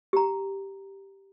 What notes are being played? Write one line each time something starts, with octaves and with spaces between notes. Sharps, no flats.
G4 A#5